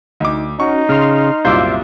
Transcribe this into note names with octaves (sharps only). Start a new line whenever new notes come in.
D2 D#4 D6
C#4 D#4 F#4 C#6
C#3 C6 F6
C2 F#2 A#2 F4 C5 E5 D6